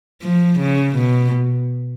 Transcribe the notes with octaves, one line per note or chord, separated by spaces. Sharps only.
F3
C#3
B2